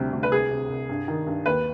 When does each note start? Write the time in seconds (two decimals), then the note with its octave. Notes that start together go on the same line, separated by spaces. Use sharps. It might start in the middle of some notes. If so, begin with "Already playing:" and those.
Already playing: D2 C3 G3
0.13 D2
0.23 B4
0.32 C2 G#4
0.51 C3
0.69 C2
0.89 G2
1.08 D#3
1.27 G2
1.46 D#2 B4